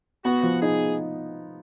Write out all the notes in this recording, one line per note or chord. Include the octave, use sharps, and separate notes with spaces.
B3 F#4
F3
D#4 G#4